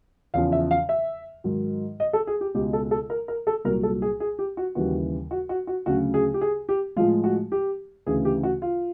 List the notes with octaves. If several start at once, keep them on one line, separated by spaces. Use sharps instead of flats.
E2 C#3 F3 F5
E5
F5
E5
G#2 D#3 F#3
D#5
A4
G#4
G4
C#2 B2 G#3 G4
A4
A4
A#4
A#4
A4
C2 A#2 F#3 A#4
A4
G#4
G#4
G4
F#4
D#2 C#3 E3 G3 F#4
F#4
F#4
F#4
D2 C#3 F#3 F#4
G#4
G4
G#4
G4
A2 F3 G#3 F4
F#4
G4
D2 C#3 E3 G#4
G4
F#4
F4